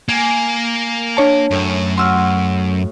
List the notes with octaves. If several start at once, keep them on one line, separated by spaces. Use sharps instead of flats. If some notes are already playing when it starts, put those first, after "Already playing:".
A#3 G#5
D4 C#5 A5
F#2 A2
F#4 C6 E6 F6